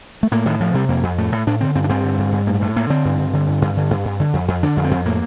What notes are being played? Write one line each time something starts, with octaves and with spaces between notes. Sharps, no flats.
A3
A2 A#3
A2 D#3
A2 F3
C3 G3
F2 A#3
F2
A2 A3
A2
A2 D4
D3 C4
G2 C4
D4
G2 C4
D3
G2
G2
A2 A#3
G3
A2 A3
A2 A#3
D3 C4
G2
G2
D3
G2
G2
D3
G2
G2
D3
F2
F2
D3 D4
F2
C4
F2
A2 A#3